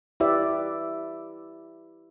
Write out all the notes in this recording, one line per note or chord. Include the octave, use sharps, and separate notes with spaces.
E4 G4 B4 D5 E5